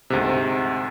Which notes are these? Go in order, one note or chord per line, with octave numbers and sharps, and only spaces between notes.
D2 G#2 C3